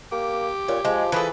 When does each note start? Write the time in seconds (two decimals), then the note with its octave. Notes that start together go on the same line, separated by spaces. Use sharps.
0.12 A#3 G4
0.68 A#2 C#5
0.85 F3 G#3
1.12 E3 G#4 A4 B4